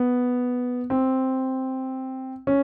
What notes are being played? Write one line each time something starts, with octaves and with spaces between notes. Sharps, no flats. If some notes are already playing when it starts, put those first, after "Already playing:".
Already playing: B3
C4
C#4